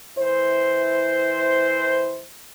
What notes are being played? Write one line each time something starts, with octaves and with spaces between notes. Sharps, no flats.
E3 E4 C5